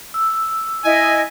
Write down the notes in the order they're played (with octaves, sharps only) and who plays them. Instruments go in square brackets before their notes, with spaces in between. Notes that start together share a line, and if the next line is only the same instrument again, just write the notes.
[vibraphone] E6
[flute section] E4 D#5 [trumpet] G#5